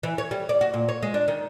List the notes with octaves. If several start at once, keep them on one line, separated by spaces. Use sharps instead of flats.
E3
C#5
G3
D5
F#4
A#2
C#5
G#3
D4
D#3